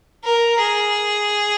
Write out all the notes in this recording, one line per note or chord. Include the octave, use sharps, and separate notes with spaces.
A#4
G#4